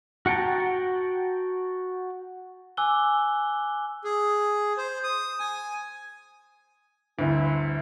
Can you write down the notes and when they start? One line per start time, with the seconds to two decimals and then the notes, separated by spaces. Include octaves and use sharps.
0.26 F#4 F#5 G5 A5 A#5
2.77 G#5 D6 E6 F#6 G7
4.04 G#4
4.77 C5
5.04 D#6
5.40 G#5
7.19 G1 D2 E4